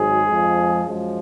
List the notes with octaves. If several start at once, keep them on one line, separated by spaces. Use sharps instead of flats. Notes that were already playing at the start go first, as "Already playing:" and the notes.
Already playing: G#1 G#2 F#3 G#4
F2 F3 G#3
F#2 F3 G#3